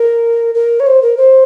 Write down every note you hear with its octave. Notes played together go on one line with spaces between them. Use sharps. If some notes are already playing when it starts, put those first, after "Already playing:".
Already playing: A#4
A#4
C#5
C5
A#4
C5